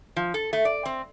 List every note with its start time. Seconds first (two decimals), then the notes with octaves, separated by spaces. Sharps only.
0.16 F3
0.34 A4
0.53 A3
0.65 D5
0.85 C4